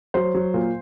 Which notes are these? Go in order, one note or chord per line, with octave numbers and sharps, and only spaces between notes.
F#3 C5
F#3
A#2